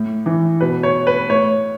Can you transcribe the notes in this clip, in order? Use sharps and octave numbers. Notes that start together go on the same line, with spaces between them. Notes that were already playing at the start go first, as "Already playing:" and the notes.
Already playing: A2
E3
B2 B4
C#5
B4
A2 C#5